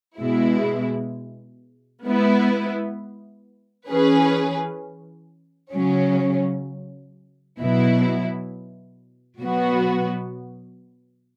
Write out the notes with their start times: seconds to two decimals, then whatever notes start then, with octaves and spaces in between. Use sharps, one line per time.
0.20 B2 G#3 E4
2.04 G#3 B3 E4
3.90 E3 C#4 G#4 B4
5.74 C#3 F#3 C#4
7.59 B2 F#3 E4
9.42 B2 F#3 B3 F#4